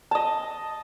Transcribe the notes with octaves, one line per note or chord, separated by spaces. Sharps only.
D#5 A5